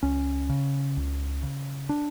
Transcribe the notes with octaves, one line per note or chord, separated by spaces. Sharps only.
C#2 C#4
C#3
C#2
C#3
D4